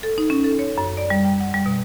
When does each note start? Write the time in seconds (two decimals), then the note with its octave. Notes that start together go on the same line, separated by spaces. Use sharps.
0.03 A4
0.18 D#4
0.30 C#4
0.44 A4
0.59 C#5
0.78 F#2
0.97 D5
1.10 G3
1.24 G5
1.40 F#5
1.54 G3
1.66 B2